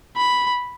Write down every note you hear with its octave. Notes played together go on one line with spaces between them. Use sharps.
B5